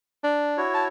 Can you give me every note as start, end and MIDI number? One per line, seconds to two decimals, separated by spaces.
0.24 0.61 62
0.57 0.88 64
0.57 0.88 66
0.57 0.88 73
0.74 0.85 81